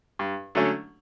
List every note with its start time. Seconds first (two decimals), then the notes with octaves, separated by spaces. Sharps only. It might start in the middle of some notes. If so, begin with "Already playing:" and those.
0.19 G2
0.55 D3 F#3 A3 C#4